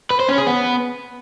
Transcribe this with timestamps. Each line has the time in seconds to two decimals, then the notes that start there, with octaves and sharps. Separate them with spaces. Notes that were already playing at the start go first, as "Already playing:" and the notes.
0.10 B4
0.20 C5
0.29 C#4
0.38 G#4
0.47 B3